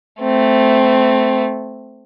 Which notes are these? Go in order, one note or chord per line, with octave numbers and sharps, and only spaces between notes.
A3 C4